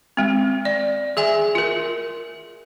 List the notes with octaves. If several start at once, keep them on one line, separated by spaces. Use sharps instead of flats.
G#3 C4
D5
G#4 E5 G#5
F4 A#4